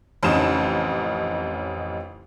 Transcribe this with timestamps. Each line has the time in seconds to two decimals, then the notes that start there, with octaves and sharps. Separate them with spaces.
0.23 A1 F2 C#3 D#4 E7